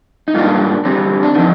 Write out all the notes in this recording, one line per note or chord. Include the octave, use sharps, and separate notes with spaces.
D#4
G#2 G3 A#3 D4 F4
D3 G3 C4
D4
D3 F3 C4 D#4